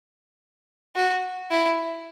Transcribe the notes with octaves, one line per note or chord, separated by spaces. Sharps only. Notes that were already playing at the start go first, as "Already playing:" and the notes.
F#4
E4